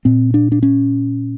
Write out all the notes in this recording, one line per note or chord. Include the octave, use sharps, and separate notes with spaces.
A#2 C4
D4
D4
C#4